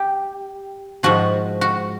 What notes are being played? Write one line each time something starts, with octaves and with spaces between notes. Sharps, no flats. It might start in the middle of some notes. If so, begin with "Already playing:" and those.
Already playing: G4
G#2 F3 F#4
F#4